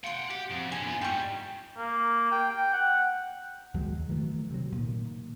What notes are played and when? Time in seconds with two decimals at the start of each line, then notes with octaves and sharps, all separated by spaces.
0.04 F4 F#5 G5 C6
0.30 F#4 G4
0.51 F2
0.72 D3 C#4 G#5
0.85 B3 F4
1.01 G#2 G3 G5 C#6
1.77 A#3
2.32 G5
2.49 G5
2.73 F#5
3.74 D#2 F#3 G#3
4.09 D#3 E3 F#3 A3
4.51 C3 F#3
4.72 A#2 D#3